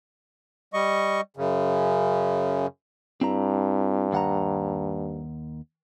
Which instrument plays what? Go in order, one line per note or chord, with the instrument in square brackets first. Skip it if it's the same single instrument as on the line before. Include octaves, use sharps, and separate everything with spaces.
[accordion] G3 D#5 C#6
F#2 C#3
[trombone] G2 [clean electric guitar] C4 E4 A#5
[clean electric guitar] D#2 F#5 A#5